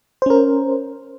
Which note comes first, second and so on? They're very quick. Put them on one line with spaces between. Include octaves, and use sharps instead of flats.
C5 C#4 A#4